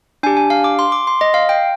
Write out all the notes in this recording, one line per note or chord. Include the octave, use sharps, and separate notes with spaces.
D4 G4 G#5
G#5
F5
D6
C6
D6
C6
D#5
F5
G5